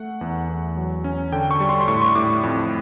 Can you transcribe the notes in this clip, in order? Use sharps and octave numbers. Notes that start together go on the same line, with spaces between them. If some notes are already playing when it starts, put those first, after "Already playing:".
Already playing: A3 F#5
E2
E2
F#3
C#4
D3 G5
C#6
G3
C6
C6
A2 C#6
C#6
A2 D6
F2